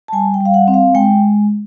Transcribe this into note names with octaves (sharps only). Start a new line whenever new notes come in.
A5
G3 G#5
G5
G3 F5
F#5
C4
F5
G#3 G5